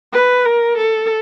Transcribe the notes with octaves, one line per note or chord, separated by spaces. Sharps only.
B4
A#4
A4